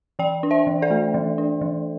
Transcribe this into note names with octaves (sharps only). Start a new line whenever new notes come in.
E3 D5 G5
D4
C5 E5
E3
A4 D5
A3
E3
D4
E3